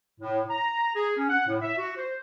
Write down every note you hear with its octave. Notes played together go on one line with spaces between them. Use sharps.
A2
A#5
G#4
C#4
F#5
A2
E5
F#4
C5